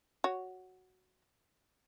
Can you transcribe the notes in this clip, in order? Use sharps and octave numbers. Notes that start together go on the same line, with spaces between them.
F#4 C#5